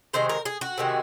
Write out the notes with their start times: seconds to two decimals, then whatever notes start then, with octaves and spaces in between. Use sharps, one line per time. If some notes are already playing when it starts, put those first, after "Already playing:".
0.14 C3 D#3 G#3 C5
0.29 A#4
0.45 G#4
0.61 F#4
0.78 C3 D#3 G#3